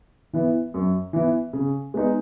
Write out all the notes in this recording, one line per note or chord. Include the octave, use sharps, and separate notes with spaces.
E3 B3 E4
F#2
E3 B3 E4
C#3
G#3 B3 D#4